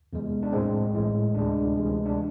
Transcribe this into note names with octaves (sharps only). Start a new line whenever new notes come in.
E2 C3 G#3
D4
B1 A2 G#3 C4
A1 A2 G#3
D2 C3 G#3 D4
D2 C3 E3 G#3
D4